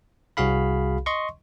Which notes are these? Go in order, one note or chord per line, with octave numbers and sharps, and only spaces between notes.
C2 F#4 G#4 F5 B5
D#5 C6 C#6